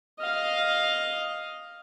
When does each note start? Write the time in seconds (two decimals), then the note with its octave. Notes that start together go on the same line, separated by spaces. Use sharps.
0.20 D#5 F5